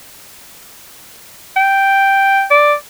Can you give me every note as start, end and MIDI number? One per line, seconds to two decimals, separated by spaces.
1.56 2.44 79
2.51 2.74 74